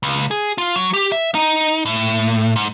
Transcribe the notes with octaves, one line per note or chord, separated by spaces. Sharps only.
C#2
G#4
F4
F#3
G4
E5
D#4
A2
G#2